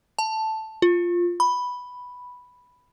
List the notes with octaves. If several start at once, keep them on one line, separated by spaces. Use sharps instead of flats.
A5
F4
B5